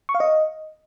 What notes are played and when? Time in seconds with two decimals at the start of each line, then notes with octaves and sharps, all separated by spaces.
0.09 C#6
0.15 F5
0.20 D#5